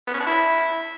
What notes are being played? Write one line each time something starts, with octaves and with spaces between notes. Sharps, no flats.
B3
C#4
D4
E4